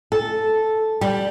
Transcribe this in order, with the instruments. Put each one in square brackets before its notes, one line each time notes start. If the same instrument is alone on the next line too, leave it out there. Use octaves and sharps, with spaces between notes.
[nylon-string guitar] A4
G3